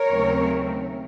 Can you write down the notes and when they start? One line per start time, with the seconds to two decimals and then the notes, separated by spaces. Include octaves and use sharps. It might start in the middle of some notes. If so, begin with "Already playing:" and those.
Already playing: A#4 C#5
0.09 D#2 C#3 F#3 A3 C4